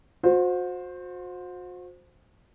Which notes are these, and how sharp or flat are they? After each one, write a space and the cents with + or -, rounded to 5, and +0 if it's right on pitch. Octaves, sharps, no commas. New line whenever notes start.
F#4 -40 C5 +0